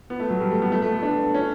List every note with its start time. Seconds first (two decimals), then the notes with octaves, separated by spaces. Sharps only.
0.10 B3
0.20 A3
0.30 F#3
0.40 G3
0.51 A3
0.62 B3
0.72 A3
0.82 A3
0.92 B3
1.03 D4
1.34 C#4